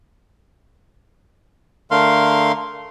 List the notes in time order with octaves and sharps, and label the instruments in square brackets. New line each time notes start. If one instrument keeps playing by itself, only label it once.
[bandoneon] D3 A3 A#4 F5 C6